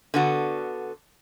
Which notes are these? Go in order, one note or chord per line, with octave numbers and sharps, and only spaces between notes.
D3 B3 F#4